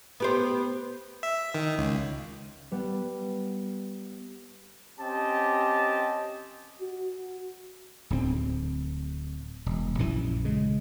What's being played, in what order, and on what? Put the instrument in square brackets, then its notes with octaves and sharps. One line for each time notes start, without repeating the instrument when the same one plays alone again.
[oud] B3 G4 C5
[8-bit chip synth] E5
D#3
C#2
[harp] G3 B3
[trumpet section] C4 C#4 G4 D#5 A5
[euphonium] F#4
[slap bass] D1 D2 B3 C4
E1
A#1 F#2 E3
C#3 G#3